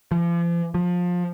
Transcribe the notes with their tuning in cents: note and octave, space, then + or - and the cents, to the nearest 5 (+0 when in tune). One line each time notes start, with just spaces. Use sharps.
F3 -40
F3 +20